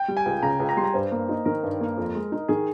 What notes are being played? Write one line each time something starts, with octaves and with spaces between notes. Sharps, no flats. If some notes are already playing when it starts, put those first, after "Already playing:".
Already playing: G5
G3
G#5
C#2
C#3 A#5
C#2
A#5
G3 C6
A#5
G2 C5
A#3
D#4
D#3 A#4
G2
A#3
F2
G#3
D#4
D#3 G#4